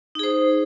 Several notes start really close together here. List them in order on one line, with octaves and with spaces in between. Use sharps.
D#4 G#4 C5